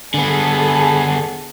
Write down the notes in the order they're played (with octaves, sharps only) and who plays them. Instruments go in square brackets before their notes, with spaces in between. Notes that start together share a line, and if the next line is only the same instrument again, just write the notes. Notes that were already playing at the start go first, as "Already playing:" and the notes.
[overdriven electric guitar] D3 B3 [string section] G#4 A4